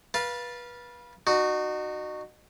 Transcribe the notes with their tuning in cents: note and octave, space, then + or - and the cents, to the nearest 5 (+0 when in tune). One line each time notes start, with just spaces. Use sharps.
B4 -25 F5 +0 A5 +0
D#4 -35 F#4 +0